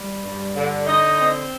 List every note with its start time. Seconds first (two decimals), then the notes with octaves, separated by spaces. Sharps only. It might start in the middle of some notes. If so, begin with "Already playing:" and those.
Already playing: G3
0.22 G2
0.54 D3
0.87 D3 D#4 D#5
1.19 C4